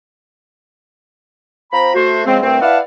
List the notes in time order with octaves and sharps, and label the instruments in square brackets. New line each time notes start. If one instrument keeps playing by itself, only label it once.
[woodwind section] F3 C4 A#5 B5
A3 F#4 C5
C#3 F3 G#3 C4
C2 G2 A3 C4
E4 B4 D5 F5 F#5 A5